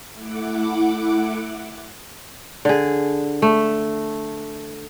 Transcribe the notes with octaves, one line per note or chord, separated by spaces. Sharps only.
A3 E4 F#5 D6
D3 G#4
A3